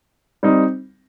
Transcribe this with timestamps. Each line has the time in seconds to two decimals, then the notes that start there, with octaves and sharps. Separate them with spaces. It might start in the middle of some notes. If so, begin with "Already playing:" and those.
0.43 G3 C4 D#4